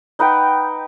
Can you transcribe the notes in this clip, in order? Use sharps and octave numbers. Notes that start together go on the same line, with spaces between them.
D#4 B4 F#5 G5